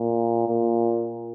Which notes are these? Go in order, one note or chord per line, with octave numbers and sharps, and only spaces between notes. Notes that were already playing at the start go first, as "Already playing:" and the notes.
Already playing: A#2
A#2